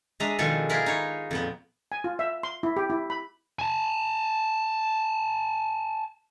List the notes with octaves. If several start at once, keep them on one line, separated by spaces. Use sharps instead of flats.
G#3 D4 D#5 E5 A#5
B2 D#3 F3 G#3 D4 A4
E4 F4 G#4 A#4 B4 E5
D#4 C#5
F2 A#2 B3
G#5
F4
E5
C6
E4
G4
E4
B5
G#5 A5